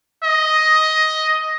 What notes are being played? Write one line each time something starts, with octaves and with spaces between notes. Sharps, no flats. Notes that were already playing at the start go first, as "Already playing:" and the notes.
D#5